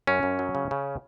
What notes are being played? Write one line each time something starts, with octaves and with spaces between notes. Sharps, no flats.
F#2 C#4
F#2
F#3
C#3
C#3